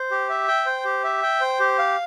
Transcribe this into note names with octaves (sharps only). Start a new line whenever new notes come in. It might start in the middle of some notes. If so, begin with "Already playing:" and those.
Already playing: C5
G4
E5
G5
C5
G4
E5
G5
C5
G4
F5